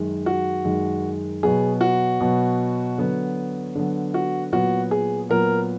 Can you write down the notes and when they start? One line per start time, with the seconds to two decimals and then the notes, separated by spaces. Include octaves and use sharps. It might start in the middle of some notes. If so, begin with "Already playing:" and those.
Already playing: F#2 D#3 G#3
0.26 F#4
0.64 F#2 D#3 G#3
1.43 B2 F#3 B3 G#4
1.81 F#4
2.20 B2 F#3 B3
2.98 D3 F#3 B3
3.75 D3 F#3 B3
4.14 F#4
4.52 A#2 F#3 B3 F#4
4.91 G#4
5.29 A#2 F#3 B3 A#4